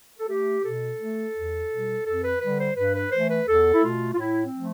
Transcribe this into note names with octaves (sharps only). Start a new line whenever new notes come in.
A4
A3 G4
B2 A4
A3
E2
B2
G3
F2 A4
B4
D3 G3 B4
C5
G2 B4
B4
E3 A3 C5
B4
E2 A4
E4
B2 A3 F4
F4
A2 E4
C4
F3 A3